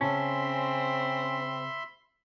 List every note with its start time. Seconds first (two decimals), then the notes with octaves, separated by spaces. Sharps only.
0.01 C#3 C4 C#4 E5 A5 B5 C6